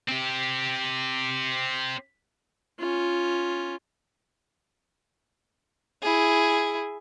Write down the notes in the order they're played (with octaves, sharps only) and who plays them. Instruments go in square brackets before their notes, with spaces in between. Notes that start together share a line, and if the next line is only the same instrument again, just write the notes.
[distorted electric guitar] C4 G4
[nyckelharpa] C#4 F4
[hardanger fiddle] E4 G#4